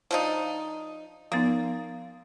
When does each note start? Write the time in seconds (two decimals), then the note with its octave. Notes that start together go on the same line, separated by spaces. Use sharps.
0.11 F3 D4 D#4
1.32 F3 A#3 B3 D#4